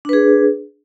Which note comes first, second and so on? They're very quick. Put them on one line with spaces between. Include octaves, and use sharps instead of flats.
D4 B4 G#4